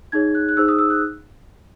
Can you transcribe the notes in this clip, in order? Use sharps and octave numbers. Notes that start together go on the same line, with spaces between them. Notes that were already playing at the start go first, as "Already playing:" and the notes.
D#4 G#4 C#5 G#6
F#6
F#6
D#4 G#4 C5 E6
D#6
E6
F#6